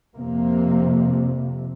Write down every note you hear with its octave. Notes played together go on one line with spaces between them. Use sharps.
F2 C3 A#3